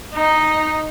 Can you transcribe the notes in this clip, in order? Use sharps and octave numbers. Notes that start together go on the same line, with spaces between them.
D#4